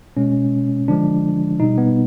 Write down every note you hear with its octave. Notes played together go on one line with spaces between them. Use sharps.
B2 G#3 C#4
D3 F3 G#3 D4
B2 G3 D#4
B3